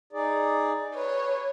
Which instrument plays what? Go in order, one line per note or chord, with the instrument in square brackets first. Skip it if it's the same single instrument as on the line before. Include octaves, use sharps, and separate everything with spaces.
[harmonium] D#4 G#4 D5
[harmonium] B4 [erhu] C#5